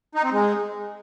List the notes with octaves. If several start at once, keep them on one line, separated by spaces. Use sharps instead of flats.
D#4
C4
G#3